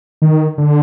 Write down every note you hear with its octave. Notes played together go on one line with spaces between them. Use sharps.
D#3
D3